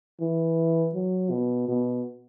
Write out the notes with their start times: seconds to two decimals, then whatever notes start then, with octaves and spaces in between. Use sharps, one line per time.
0.21 E3
0.95 F#3
1.31 B2
1.68 B2